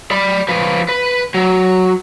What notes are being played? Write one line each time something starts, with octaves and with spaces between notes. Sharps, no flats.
D5 B5
F3 B4
B4
F#3